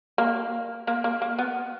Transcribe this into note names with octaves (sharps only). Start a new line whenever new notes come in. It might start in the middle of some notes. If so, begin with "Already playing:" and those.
A#3
A#3
A#3
A#3
B3